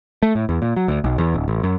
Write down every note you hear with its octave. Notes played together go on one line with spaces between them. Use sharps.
A3
A2
E2
A#2
F#3
D2
B1
E2
D1
A1
F#2